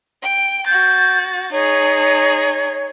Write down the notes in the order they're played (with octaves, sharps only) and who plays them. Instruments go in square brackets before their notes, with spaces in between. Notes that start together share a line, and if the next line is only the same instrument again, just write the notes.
[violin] G5
[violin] F#4 A6 [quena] G6
[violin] D#4 G#4 [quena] C#5